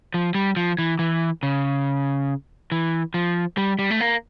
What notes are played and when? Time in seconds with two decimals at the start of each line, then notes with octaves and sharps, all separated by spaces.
0.14 F3
0.35 G3
0.56 F3
0.79 E3
0.99 E3
1.43 C#3
2.72 E3
3.14 F3
3.57 G3
3.79 G3
3.91 A3
4.00 A#3